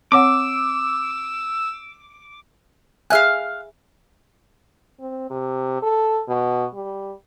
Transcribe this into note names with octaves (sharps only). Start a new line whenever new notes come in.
C4 C#5 F#5 D6 E6
G#4 E5 F5 G#5 F6 F#6
C4
C3
A4
B2
G3